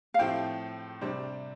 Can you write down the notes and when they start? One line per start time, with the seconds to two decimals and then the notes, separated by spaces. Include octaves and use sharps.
0.14 F5
0.19 A2 F3 A3 C4 G4 G5
1.01 C3 G3 D4 G4 C5